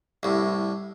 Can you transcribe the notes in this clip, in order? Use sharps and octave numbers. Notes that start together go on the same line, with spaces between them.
C2 A2